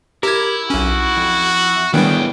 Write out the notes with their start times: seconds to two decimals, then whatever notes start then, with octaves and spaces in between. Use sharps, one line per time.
0.23 E4 G4 A#4 G#6
0.70 B1 C#4 F#4
1.16 F2
1.94 B1 A2 D#3 G3 B3 D4 G#4 G5